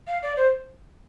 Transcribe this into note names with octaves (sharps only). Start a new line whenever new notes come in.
F5
D5
C5